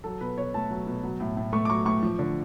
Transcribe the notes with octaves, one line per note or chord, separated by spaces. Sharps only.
F#3 A4
B2 B4
B2 C#5
A3 A5
F#3
B2
F#3
A2
A2
A3 C#6
D6
F#3 C#6
A2 C#6
F3
D3